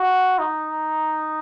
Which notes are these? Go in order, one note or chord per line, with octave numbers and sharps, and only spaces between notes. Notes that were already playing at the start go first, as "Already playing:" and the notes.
Already playing: F#4
D#4